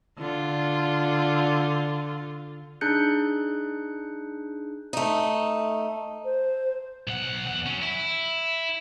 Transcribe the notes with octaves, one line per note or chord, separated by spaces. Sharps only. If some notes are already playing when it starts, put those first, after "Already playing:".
D3 F4
D4 D#4 G#4 F#6 G6 C#7
A3 D#4
C5
B1 F#5
E2 F#5
F#3 C#4
E4